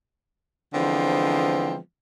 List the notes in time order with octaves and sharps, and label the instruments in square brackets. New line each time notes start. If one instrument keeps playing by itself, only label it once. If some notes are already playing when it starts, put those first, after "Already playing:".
[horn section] D3 E3 F3 G#3 B3 C4